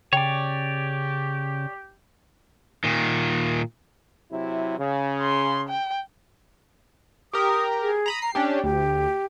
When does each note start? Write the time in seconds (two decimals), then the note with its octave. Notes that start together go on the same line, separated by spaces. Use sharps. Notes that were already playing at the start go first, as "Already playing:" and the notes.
0.13 C#3 G4 C#5 D5 G5 G#5
2.84 A#2 D#3
4.31 C3 F#3 E4
4.78 C#3
5.22 C6
5.69 G5
7.33 G4 A#4 D#6
7.81 G#4
8.06 A#5 B5 D#6
8.22 A#5 C7
8.35 C#4 D4 G4 G5
8.64 D2 G4